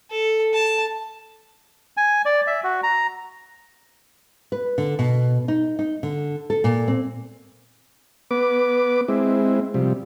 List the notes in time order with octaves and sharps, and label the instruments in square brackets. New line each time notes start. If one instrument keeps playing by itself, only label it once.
[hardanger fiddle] A4
A5
[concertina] G#5
D5
E5
F#4
A#5
[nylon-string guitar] B4
D3
B2
D#4
D#4
D3
A4
A#2
C4
[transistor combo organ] B3 B4 D6
G#3 C4 E4
C3 F3 G3